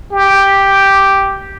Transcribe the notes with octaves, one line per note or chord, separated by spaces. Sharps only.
G4